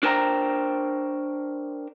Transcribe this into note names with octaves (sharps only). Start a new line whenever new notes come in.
D4 A#4 C5 G5 G#5 A#5